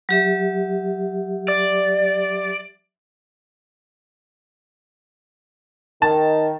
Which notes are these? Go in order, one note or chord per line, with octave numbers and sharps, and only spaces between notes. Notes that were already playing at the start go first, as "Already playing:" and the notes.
F#3 G4 E5
D5
D#3 A5